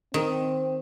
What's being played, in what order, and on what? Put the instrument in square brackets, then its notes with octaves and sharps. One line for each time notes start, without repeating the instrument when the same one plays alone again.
[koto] D#3 [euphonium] C4